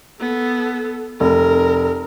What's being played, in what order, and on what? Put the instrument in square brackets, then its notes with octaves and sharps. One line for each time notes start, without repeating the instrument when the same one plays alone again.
[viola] B3 A4
[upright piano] F1 [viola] A#4